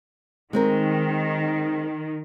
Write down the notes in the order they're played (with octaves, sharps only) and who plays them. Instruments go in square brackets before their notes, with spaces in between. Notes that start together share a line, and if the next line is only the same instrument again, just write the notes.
[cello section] D#3 [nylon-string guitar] G#3 C4 A#4